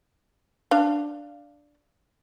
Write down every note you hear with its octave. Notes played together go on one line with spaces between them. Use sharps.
D4 F5